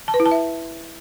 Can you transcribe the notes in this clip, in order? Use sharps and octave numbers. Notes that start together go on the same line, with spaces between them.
A5
B4
E4
A5
E5